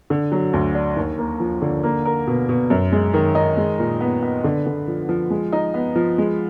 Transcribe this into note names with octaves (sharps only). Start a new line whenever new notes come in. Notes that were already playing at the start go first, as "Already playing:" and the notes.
D3
F#3
D2
D4
D#2
A#3
F3
D3
A#3
A#4
B2
B2
F#2
G#3
D#3
D#4
G#3
A#2
B3
B3
D3
D3
F3
F3
G#3
D#4
B3
F3
G#3